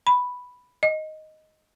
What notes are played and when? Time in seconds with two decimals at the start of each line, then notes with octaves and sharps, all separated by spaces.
0.07 B5
0.83 D#5